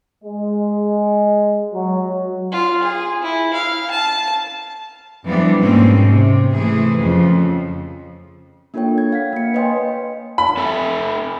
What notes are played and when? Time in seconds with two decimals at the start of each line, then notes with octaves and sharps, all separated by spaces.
0.24 G#3
1.74 F#3
2.52 F4
2.82 G#4
3.22 E4
3.53 F5
3.91 A5
5.24 F2 E3 F3 G3 B3 D4
5.59 G#2 B2 G3 A#3 C4 C#4
6.06 C3
6.53 C3 E3 A3 G#4
6.99 F2 C#3 F3
8.74 A#3 D4 F4 A4 C#5 G5
8.98 G#6
9.12 F5 F#5 B6
9.33 A#3 C#7
9.54 B4 C#5 D#5 G5 G#5 C6
10.38 B5
10.57 C4 A4 E5